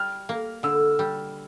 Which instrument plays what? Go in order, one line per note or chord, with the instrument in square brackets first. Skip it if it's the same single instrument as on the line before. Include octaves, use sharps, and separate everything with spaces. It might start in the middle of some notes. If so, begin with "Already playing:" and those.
Already playing: [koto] G3 [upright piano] F6
[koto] A#3
[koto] D3 [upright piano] E6
[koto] G3